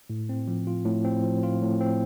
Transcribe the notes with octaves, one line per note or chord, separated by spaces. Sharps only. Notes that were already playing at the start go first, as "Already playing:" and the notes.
A2
C4
F3
F4
A2
C4
F3
F4
A2
C4